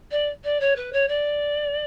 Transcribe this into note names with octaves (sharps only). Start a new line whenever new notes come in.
D5
D5
C#5
B4
C#5
D5